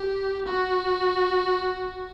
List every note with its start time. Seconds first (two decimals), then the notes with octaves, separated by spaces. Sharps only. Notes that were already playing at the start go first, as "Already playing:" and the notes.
Already playing: G4
0.45 F#4